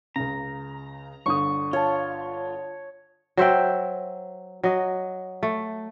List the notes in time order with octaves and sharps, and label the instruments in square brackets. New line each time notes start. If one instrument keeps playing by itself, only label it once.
[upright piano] C#2 C#3 [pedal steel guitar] A#5
[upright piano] G1 D3 D#6 [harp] C#6
[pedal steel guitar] F4 [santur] C#5 A5
[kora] F#3 C5 E5 G5
F#3 D#5
A3